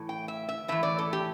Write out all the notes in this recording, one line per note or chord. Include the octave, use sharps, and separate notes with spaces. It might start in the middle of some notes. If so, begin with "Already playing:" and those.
Already playing: A2 E3
G5
E5
E5
A2 E3 E5
D5
A4
G4